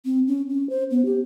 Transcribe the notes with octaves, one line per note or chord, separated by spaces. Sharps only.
C4
C#4
C#4
C5
B3
G4